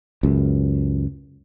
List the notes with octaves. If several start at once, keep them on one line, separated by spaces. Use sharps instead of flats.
C#2 F#2